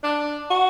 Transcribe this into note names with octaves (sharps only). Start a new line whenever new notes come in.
D4
F#4